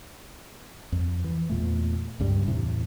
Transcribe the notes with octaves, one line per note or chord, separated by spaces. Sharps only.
F2
E3
E2 A#2 A3
C#2 G2 G3
E2 A2 C3